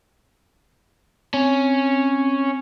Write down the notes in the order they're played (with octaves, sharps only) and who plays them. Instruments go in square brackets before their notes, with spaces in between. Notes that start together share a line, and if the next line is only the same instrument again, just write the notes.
[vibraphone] C4 [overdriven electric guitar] C#4